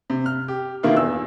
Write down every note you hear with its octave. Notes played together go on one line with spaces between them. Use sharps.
C3
F6
G4
B2 D#3 A#3 E4 F4
E2 E6